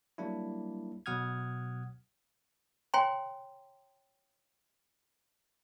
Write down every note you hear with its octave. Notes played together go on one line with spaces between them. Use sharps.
F#3 G3 A#3 D4 E4
B2 F#3 F#5 D#6 F6 G#6
C#5 G5 G#5 A#5 C6